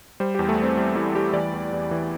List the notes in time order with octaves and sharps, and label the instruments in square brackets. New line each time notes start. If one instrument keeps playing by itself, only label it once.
[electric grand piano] G3 C5
E2 G4
A3
G3
C4
G3
G3 E4
G3 G4
E3 D5
E2
E2
E3